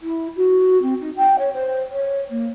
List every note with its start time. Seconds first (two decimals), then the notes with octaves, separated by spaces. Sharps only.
0.01 E4
0.37 F#4
0.82 C4
1.01 D#4
1.17 G5
1.39 C#5
1.54 C5
1.91 C#5
2.30 A#3